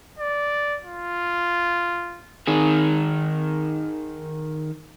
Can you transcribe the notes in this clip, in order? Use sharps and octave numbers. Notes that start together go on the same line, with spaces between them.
D5
F4
D#3 G#4